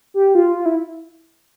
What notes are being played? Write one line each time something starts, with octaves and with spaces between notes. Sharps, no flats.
G4
F4
F4
E4